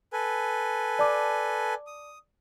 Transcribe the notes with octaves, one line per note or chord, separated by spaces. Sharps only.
A4 B4 G#5
D5 A5 D6
D#6